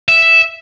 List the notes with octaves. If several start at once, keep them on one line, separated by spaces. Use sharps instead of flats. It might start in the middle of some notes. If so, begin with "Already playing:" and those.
E5